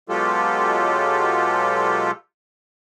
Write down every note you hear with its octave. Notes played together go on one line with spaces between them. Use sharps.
B2 F#3 G#3 F4 G4 A4